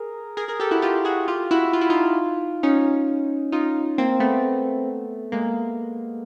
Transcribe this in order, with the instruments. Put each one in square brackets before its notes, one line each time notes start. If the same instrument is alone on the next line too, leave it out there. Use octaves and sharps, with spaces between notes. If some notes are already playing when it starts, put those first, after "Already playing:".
Already playing: [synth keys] G#4 A#4
G#4 A#4
G#4 A#4
G4 A4
E4 F#4
F4 G4
F#4 G#4
F4 G4
E4 F#4
F4
E4
D#4 F4
C#4 D#4
D#4 F4
A#3 C4
A3 B3
G#3 A#3